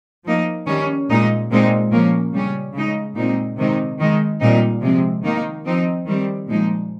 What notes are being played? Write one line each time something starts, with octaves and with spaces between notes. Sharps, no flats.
F3 A#3 D#4
D#3 G3 C#4
A#2 G#3 D#4
A#2 G#3 C4 D#4
A#2 F3 A#3 C#4
C#3 G3 C#4
C#3 G#3 D#4
A#2 G#3 C4 D#4
C3 D#3 G#3 C4 D#4
D#3 G#3 D#4
A#2 G3 C4 D#4
C3 F3 G#3 C4
D#3 A#3 D#4
F3 C4 D#4
D#3 G3 C4
A#2 F3 G#3 D#4